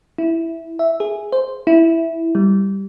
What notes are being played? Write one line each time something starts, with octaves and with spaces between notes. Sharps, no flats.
E4
E5
G#4
C5
E4
G3